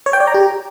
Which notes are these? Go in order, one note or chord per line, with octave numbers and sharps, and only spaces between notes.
C#5
G5
D5
A#5
G4